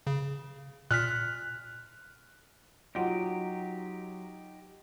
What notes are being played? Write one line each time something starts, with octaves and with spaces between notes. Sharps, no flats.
C#3
A#2 F6 F#6 B6
F#3 D#4 F4 G4 D#5 F#5 C6